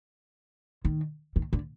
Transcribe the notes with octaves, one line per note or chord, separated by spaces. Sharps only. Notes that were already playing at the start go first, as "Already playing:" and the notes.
D#3
D#3
D3